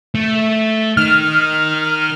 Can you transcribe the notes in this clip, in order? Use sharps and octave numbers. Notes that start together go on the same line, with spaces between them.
A3
D#3 F6